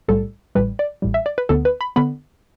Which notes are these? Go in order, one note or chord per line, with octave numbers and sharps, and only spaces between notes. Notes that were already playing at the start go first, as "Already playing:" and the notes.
B1 A2 G3 A4
A1 A2 G3 B4
D5
A1 A2 G3
E5
D5
B4
D2 D3 B3 A4
B4
B5
D3 B3 B5